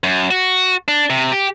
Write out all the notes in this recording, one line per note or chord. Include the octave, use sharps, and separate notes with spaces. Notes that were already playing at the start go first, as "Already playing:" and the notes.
F#2
F#4
D4
C3
G4